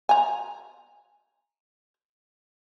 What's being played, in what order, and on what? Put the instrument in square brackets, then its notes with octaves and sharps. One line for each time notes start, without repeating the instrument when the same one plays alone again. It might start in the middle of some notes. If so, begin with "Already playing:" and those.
[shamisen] G#5 A#5